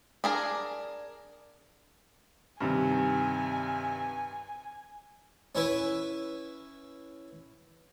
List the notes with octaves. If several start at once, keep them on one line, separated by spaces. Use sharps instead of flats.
D4 G#4 A#4
G2 C3 D#3 G#5
C#4 E4 B4